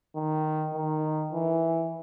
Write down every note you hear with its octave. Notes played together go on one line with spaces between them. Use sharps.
D#3
D#3
E3